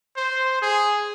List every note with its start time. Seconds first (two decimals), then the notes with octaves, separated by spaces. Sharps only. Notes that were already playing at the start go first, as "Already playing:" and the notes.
0.17 C5
0.62 G#4